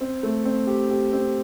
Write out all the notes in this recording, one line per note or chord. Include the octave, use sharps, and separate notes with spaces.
C4
A3
C4
G4
G4
C4